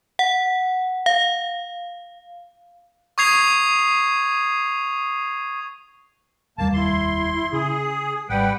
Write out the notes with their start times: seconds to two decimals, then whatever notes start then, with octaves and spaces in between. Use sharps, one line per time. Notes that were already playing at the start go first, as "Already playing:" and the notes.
0.19 F#5
1.06 F5
3.18 C#6 D#6 G#6 C7 F7
6.58 F1 D#2 G3 A#3 A5
6.74 E4 C6
7.53 C#3 G#4
8.29 G#1 G3 B4 F#5 G5